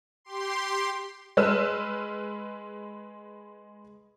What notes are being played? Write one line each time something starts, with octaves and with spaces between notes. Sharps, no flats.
G4 C6
G#3 B4 E6 F6 E7